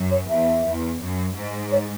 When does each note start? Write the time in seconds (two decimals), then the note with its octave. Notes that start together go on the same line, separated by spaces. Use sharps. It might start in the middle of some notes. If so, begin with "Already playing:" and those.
Already playing: F#2
0.11 C#5
0.29 E2 E5
0.65 E2
1.01 F#2
1.36 G#2
1.72 C#5